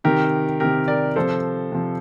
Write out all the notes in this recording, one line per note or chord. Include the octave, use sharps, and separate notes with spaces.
C3 D#3 G4 A#4
C3 D#3 G4 A#4
A#4 D5
C3 F3 A4 C5
C3 F3